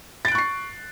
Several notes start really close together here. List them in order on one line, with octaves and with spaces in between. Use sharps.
A6 D7 F#6 C#6 C7